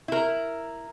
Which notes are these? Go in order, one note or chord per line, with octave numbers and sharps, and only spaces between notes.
E4 A#4